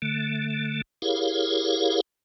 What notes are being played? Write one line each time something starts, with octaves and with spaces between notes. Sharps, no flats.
D3 A3
E4 G4 G#4 A#4 C#5 F5